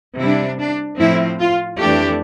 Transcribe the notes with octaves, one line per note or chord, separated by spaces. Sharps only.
C3 G3 D4 E4
D4
A2 F3 C4 E4
F4
F2 E3 A3 D4 G4